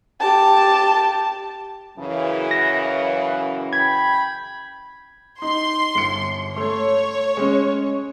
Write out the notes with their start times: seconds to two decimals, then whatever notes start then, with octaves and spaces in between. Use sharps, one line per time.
0.20 G4 A5
1.98 F#2 C#3 E3
2.51 F#5 A#6
3.73 G5 B5 G#6
5.42 D#4 C6
5.95 G1 C#7
6.56 A3 C#5 C6
7.37 G#3 C#4